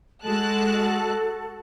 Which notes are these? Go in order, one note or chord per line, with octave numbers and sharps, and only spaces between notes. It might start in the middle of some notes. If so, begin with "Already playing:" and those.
G#3 F#4 A4 A5 F#6